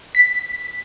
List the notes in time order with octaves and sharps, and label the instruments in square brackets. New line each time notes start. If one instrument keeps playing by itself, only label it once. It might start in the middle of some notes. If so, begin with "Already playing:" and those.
[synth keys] B6